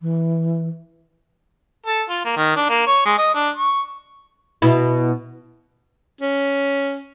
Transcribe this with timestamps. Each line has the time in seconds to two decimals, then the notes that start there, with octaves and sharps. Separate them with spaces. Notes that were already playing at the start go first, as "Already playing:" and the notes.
0.01 E3
1.86 A4
2.09 F4
2.24 A#3
2.36 D#3
2.56 D4
2.69 A#3
2.87 C#5
3.05 G#3
3.18 D#5
3.34 D4
3.56 C#6
4.62 B2 E4
6.21 C#4